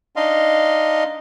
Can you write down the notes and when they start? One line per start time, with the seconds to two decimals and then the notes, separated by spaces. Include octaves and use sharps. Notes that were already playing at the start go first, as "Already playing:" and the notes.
0.16 D4 D#4 D#5 F5 C6